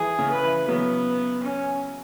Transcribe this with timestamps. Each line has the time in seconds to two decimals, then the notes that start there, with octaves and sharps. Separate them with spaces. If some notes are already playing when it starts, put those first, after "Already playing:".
Already playing: E3 G#4
0.19 C#3
0.30 B4
0.43 E3
0.68 C#3 F#3 B3
1.43 C#4